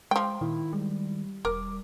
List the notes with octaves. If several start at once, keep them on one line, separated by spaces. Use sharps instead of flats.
F3 G#3 G5
A#2 D#3 E4
G3 G#3
E1 A#4 D6